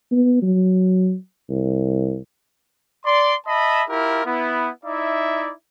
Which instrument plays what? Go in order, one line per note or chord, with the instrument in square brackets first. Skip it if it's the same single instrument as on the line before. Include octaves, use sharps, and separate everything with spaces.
[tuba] B3
F#3
C2
[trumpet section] D5 C6
D#5 E5 A5 B5
E4 F4 G4 A#4
B3 E4
D#4 E4 D5 E5